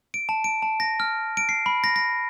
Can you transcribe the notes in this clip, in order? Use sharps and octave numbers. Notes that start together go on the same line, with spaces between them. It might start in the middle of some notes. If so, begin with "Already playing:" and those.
D7
A5
D7
A5
A#6
F6
D7
C7
B5
A#6
A#6